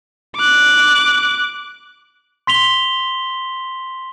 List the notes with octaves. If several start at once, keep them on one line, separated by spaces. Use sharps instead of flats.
D6 F#6
C6 B6 F7 G7